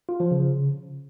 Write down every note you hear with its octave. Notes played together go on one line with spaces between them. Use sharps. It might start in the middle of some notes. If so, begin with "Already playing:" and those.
F4
F3
C#3